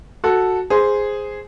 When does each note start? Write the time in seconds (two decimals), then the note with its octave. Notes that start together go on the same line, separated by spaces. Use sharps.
0.24 F#4 A4
0.70 G#4 C5